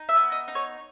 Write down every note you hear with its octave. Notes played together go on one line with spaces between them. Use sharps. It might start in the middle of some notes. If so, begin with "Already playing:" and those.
Already playing: D#4
E5
B3
D#5
D#4
C#5